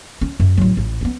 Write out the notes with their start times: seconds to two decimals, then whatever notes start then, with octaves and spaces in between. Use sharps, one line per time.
0.21 C#4
0.40 F#2
0.57 A1 F#3
0.77 A1
1.01 B3 C#4